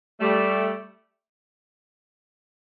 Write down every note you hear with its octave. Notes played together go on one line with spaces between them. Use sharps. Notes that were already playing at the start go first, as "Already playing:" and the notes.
G3 A3